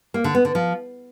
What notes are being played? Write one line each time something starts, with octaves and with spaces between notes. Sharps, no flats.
A#3
D3
B3
D3
F3